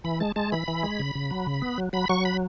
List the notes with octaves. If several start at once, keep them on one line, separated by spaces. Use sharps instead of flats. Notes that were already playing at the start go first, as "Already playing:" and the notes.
E3 B5
G#3 A5
G#3 A5
E3 B5
E3
G#3
C#3
C#3
F#3
C#3
B3
F#3
F#3 B5
F#3 C#6
B5